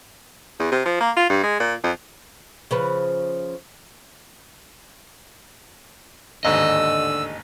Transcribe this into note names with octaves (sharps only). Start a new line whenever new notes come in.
E2
C3
F3
A#3
F4
G2
G#3
A#2
F2
C#3 F3 B4
A1 D#2 G#2 D3 D#5 E6